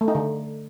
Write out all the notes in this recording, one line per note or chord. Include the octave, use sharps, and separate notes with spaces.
A3
D#4
D3